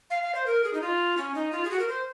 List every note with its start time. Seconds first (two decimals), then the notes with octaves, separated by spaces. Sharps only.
0.10 F5
0.22 F5
0.35 C5
0.46 A#4
0.64 G#4
0.73 D#4
0.81 F4
1.17 C#4
1.35 D#4
1.52 F4
1.65 G#4
1.71 F#4
1.79 A#4
1.88 C5